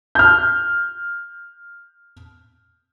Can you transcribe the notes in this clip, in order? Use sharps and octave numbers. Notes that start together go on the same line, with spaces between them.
F6 G6